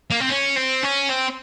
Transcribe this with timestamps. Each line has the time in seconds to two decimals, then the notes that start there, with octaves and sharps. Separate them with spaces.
0.11 A#3
0.20 C4
0.30 C#4
0.56 C4
0.84 C#4
1.10 C4